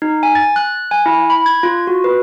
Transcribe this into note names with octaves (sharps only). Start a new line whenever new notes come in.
D#4
G#5
A6
F#6
G#5
E4
B5
G#6
F4
F#4
B4